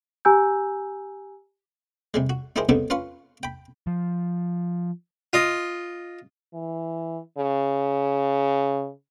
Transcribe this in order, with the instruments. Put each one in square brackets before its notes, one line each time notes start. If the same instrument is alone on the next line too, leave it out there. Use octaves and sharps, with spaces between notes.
[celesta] G4 G#5 A#5 E6 G6
[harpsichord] C3 G3 G#3
F#4
D#4 E4 G4 G#4 A#4 C5
C#3 B3 C4 D#4 G4 A4
C#4 F4 B4 F5 C6 C#6
G5 B5
[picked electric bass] F3
[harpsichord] F4 D#5
[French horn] E3
C#3